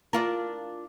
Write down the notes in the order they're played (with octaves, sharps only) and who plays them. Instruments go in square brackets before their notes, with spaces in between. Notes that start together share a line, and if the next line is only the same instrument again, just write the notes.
[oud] D4 F4 A#4